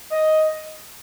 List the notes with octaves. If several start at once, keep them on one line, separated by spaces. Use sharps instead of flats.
D#5